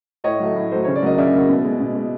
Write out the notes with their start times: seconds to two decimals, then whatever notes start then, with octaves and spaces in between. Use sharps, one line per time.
0.24 A2 C#5 D#5
0.40 F#3 A3
0.55 A2
0.71 F#3 A3 C5
0.84 C#3 C#5
0.96 D5
1.02 F#3 A#3 D#5
1.18 C#3 D5 E5
1.33 F#3 A#3
1.49 B2
1.64 G#3
1.80 B2
1.95 G#3